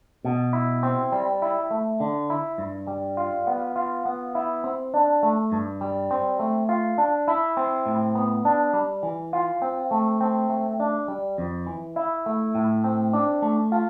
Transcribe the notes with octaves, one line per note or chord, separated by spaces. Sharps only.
B2
E4
C4
G3
E4
A3
D3
E4
G2
G3
F4
B3
F4
B3
E4
C4
D4
A3
G2
G3
C4
A3
F4
D4
E4
C4
A2
B3
D4
G3
E3
F4
C4
A3
C4
A3
D4
G3
F2
E3
E4
A3
A2
C4
D4
A3
F4